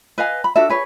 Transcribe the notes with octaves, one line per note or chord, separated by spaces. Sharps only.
B4 D#5 F5 G#5
B5
D4 F#4 A4 E5
G#4 B4 C#5